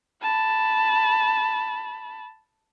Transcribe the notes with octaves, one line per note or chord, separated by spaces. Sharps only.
A5 B5